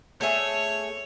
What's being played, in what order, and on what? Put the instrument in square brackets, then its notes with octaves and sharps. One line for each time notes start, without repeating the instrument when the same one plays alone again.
[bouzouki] A3 G#4 E5 [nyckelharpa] C#5